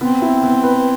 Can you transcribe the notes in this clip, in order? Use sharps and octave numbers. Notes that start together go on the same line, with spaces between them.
B3 C4
E4
B3
B4